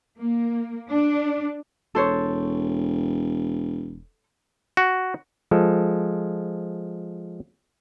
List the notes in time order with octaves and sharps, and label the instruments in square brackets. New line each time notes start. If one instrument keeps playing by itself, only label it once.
[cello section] A#3
D4
[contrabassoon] E1 [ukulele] A4 C5 C#5
[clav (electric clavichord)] F#4
F3 G#3 A4